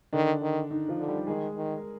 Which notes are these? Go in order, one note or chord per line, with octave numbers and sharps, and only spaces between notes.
D3 D#3 D4
D#3
D#3 D#4
F3 F4
D3
G3 G4
D#3 G#3 G#4
D#3
A#4